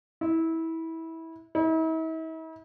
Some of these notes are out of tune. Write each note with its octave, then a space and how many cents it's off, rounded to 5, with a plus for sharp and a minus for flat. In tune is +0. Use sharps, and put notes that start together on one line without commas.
E4 -20
E4 -45